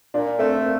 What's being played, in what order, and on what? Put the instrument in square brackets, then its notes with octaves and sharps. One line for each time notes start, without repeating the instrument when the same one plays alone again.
[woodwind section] A#2 [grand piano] D4
[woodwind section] A3 [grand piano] C4
[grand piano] C4
A#3